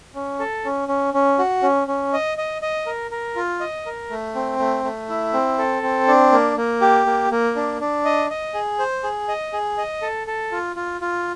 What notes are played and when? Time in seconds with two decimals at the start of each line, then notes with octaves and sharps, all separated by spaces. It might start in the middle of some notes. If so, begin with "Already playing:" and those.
0.15 C#4
0.39 A4
0.65 C#4
0.88 C#4
1.14 C#4
1.39 F#4
1.63 C#4
1.88 C#4
2.13 D#5
2.38 D#5
2.62 D#5
2.86 A#4
3.11 A#4
3.36 F4
3.61 D#5
3.86 A#4
4.10 A3
4.35 C4
4.59 A3
4.84 A3
5.09 E4
5.33 C4
5.58 A4
5.83 C4
6.08 D4
6.32 A#3
6.57 A#3
6.81 G4
7.06 A#3
7.31 A#3
7.56 D4
7.81 D4
8.05 D#5
8.30 D#5
8.54 G#4
8.79 C5
9.04 G#4
9.28 D#5
9.53 G#4
9.78 D#5
10.02 A4
10.27 A4
10.52 F4
10.76 F4
11.01 F4